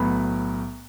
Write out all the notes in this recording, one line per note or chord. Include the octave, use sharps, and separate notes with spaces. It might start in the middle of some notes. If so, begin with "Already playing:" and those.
Already playing: B1 A2 F#3 B3 B5